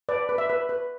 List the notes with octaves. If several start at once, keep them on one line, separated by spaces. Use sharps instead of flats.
B4 D5
B4
E5
B4
B4